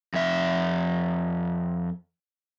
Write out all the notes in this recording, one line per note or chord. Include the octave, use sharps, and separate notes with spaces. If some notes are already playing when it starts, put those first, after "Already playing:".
F2 E5